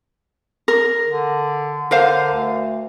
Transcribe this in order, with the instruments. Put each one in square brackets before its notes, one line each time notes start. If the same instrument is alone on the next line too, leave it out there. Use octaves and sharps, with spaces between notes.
[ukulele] A#4
[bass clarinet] D3
[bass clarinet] D3 [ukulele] A#4 C5 F5
[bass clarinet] D2